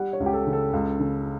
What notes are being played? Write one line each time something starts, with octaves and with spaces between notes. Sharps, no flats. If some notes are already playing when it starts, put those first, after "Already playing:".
Already playing: G3 F#5
C#5
C#2
G4
A4
C#3
A4
C#2
C#3